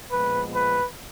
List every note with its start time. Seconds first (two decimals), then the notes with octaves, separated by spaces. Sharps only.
0.09 A#2 F3 G#3 B3 B4
0.53 B4